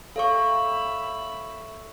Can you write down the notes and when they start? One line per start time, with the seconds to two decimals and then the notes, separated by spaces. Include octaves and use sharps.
0.16 A4 C#5 E5 F5 B5 C#6